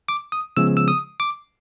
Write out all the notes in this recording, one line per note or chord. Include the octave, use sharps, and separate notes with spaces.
D6
D#6
C#3 F3 G#3 B3 E6
E6
D#6
D6